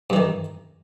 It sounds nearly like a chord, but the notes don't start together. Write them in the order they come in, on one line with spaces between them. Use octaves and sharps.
G2 E3 D#3